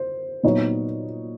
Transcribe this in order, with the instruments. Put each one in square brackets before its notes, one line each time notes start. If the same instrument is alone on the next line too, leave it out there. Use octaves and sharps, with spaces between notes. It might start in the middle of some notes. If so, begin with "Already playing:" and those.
Already playing: [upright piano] C5
A#2 F#3 B3 D#4 C#5